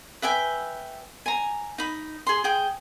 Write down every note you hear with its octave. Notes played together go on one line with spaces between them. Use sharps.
B4 E5 G5 G#5
G#5 A#5
D#4 B5
G#4 C6
G#4 G5